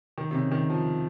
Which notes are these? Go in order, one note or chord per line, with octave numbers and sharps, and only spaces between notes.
D#3
C3
C#3
D#3
F3